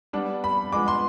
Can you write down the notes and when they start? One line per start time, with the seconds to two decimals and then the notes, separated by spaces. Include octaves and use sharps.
0.13 G3 B3 D4
0.44 B5
0.72 F3 G#3 B3 D6
0.88 C6